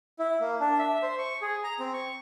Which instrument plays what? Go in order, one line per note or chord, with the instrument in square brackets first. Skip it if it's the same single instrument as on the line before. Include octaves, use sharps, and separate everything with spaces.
[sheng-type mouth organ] E4
A#3
D4
E5
C5
C#6
G#4
A#5
C4
C#6